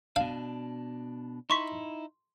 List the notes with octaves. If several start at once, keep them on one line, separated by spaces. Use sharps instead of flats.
B2 D4 F5
D#4 E4 C6 C#6 B6